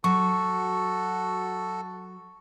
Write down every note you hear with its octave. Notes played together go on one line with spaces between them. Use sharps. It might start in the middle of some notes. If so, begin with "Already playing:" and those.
F#3 F#4 A4 C#6